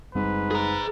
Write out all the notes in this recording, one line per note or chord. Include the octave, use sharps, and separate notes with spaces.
F#1 G#2 G3 C4 B4
G#4 A#5